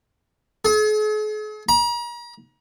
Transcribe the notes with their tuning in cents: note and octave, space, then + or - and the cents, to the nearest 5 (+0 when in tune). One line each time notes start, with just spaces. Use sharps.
G#4 +45
A#5 +40